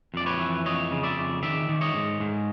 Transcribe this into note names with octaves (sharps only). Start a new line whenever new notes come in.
F2 D5
B4 C#5
E3
F2 C#5 D#5
C#3
D5 E5
F2
D#3 D5 E5
D#3
C#5 D#5
G#2
G#2